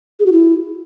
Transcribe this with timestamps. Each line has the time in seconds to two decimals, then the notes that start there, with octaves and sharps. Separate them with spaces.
0.20 G#4
0.26 F#4
0.32 E4